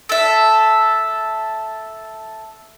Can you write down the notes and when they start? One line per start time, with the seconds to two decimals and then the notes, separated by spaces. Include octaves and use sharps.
0.09 A4 E5